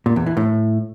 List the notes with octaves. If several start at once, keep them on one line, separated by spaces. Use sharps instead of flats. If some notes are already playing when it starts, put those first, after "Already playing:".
A#2
E2
E3
A2